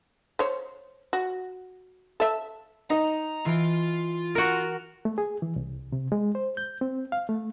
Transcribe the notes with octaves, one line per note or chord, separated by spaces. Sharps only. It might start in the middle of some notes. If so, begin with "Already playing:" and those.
C5 C#5
F#4
A4 E5
D#4 A#5
E3 F4 D7
F#4 A#4
A3
G#4
E3
C2
C3
G#3
C5
G6
C4
F5
A3